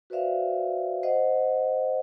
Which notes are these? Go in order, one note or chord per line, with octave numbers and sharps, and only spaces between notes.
F#4 B4 C5 D5 E5 F5
C5 D#5 F#5